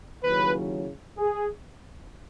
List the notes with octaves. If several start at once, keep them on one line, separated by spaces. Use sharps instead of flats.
D#2 C#3 F#3 C#4 E4 B4
G#4